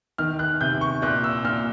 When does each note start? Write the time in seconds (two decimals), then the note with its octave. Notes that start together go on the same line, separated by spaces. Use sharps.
0.18 D#3 F6
0.39 F#6
0.61 C3 G6
0.81 C#6
1.02 A#2 F#6
1.24 E6
1.45 A#2 F6